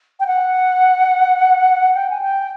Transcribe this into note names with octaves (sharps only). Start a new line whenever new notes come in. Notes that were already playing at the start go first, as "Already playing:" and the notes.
G5
F#5
G5
G#5
G5